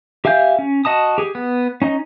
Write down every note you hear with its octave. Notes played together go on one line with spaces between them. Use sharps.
G4 E5 F5 G#5 G6
C#4
F#4 D#5 A5 D#6
G4 G#4
B3
C#4 D#4 D#5